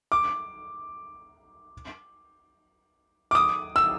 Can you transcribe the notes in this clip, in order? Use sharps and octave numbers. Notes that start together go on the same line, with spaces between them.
D6
D6
D#6
E6